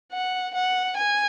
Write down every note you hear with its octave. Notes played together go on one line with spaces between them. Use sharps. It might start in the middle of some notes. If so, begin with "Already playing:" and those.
F#5
F#5
G#5